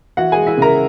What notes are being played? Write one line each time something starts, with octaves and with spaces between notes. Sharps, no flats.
E3 F#4 F#5
G#3 G#4 G#5
E4 E5
C#3 A#4 A#5